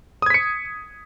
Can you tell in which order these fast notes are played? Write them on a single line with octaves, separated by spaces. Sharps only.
D#6 G#6 B6 C#7